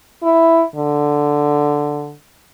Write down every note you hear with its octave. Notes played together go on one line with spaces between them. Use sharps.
E4
D3